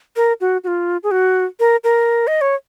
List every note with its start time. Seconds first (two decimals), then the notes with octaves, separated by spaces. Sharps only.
0.16 A#4
0.41 F#4
0.64 F#4
0.67 F4
1.03 G#4
1.11 F#4
1.60 A#4
1.84 A#4
2.27 D#5
2.41 C#5